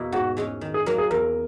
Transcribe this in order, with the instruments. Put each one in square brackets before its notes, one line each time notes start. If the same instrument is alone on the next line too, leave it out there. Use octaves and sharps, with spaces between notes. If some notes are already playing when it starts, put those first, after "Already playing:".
Already playing: [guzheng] E2 B2 A#3 E4
[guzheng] G#2 [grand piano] F#4
[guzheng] E3 G#3 C#4
D#3
[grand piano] G#4
[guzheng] F#3 A#3 [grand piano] A#4
[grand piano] G#4
[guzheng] E2 [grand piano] A#4